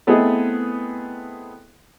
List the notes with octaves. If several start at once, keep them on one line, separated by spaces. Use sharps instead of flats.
A3 B3 C4 E4 G#4 D#5